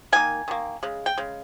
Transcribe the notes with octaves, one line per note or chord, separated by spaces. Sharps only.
D#3 A#3 G#5
D#3 A#3
C#3 G#3
G5
C#3 G#3